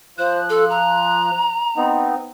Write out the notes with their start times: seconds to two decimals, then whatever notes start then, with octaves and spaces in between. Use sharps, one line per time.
0.18 F3 C5 F#6
0.50 A4
0.70 A#5
1.77 B3 C4 D#4